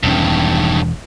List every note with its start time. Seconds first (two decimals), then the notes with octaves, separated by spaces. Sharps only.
0.03 E1 E2 G2 D#3 C#4